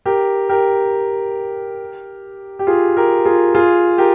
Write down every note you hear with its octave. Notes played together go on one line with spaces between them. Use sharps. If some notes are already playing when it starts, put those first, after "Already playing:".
G4 A#4
G4 A#4
G4
F4 G#4
G4 A#4
F4 G#4
F4 G#4
G4 A#4